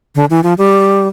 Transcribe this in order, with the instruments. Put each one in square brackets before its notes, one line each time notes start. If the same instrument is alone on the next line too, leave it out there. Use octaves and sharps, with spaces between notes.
[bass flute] D3
E3
F3
G3